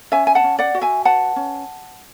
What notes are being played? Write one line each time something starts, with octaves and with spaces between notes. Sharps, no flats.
C#4 E5 G#5
G#5
F#5 A5
C#4
D5 F#5
F#4
E5 G#5
B4 F#5 A5
C#4